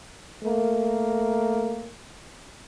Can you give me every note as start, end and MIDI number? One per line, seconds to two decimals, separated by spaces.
0.44 1.90 57
0.44 1.90 58
0.44 1.90 70